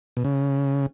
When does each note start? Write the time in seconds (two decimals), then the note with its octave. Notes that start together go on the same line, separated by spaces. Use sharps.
0.17 B2
0.24 C#3